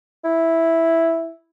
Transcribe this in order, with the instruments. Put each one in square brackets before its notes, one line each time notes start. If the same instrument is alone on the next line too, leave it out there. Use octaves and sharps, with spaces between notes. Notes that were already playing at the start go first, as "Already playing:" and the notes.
[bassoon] E4